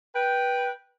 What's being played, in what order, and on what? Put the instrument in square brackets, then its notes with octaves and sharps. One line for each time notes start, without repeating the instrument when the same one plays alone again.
[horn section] B4 G5